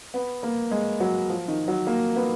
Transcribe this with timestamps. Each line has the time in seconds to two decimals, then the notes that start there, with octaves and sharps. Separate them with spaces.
0.14 B3
0.43 A#3
0.71 G#3
1.00 F#3
1.29 F3
1.48 D#3
1.68 F#3
1.87 A#3
2.16 B3